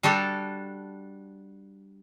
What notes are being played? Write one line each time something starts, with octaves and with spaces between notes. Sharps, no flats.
G3 D4 F#4 G4 A4